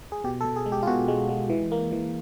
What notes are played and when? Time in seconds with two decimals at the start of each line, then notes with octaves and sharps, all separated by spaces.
0.12 G#4
0.24 B2 G4
0.41 A4
0.45 B2
0.56 G#4
0.66 G#3
0.72 G4
0.83 F4
0.87 B2 F#4
1.08 G#3
1.29 G#3
1.50 E3
1.72 A#3
1.92 E3